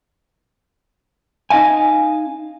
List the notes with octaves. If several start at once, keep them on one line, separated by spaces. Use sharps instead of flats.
C#4 D#4 D#5 F5 G#5